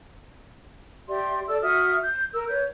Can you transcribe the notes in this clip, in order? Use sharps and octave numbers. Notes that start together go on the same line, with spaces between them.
G4 D5 E5 C6
A4 D5 E6
F#4 E5 D#6 F6
G6
A#4 E6
B4 C#5 G6